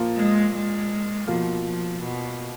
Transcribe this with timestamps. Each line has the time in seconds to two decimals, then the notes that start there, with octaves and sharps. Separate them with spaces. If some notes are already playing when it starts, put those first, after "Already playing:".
Already playing: A#2 F3 A#3 F4
0.16 G#3
0.53 G#3
1.27 B2 F3 A#3 F4
1.65 F3
2.02 B2